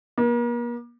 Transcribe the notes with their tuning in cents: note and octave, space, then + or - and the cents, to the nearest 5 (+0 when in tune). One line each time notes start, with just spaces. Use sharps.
A#3 +40